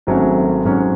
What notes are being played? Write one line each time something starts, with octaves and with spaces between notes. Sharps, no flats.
G#1 G#2 F#3 A3 C#4
G#2 F#3 C#4